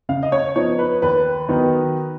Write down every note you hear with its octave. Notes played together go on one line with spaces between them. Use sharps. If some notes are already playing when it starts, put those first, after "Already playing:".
C#3 F5
D#5
C#5
F3 B3 D#4 C#5
B4
D#2 B4
D#3 F#3 B3 D#4